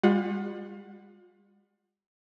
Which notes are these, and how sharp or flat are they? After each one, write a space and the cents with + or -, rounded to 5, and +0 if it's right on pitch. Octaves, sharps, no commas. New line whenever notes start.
G3 +45 F4 +35 F#5 +0